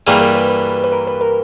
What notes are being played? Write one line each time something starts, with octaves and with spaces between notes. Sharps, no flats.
G2 E3 G3 A#3 G#4
A#4
B4
B4
B4
A#4
B4
A#4